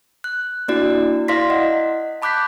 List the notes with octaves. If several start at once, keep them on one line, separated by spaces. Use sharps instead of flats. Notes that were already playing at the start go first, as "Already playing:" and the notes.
F#6
A#3 D4 E4 F#4 D5
E4 D5 F5 C6 A#6 B6
D#5 F#5
A5 B5 D6 F#6 G6 B6